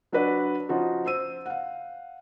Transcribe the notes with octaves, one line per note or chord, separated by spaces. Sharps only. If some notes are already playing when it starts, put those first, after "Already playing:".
F#3 D4 F#4 B4 D5 F#5
F3 C#4 D#4 F4 F#4
C5 E6 D#7
F5 F#5